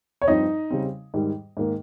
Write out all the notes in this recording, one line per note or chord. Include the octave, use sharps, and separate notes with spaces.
C#5
G2 F3 C4 D#4 D#5
C#3 G3 C4
G#2 D#3 G3
G#2 D#3 A#3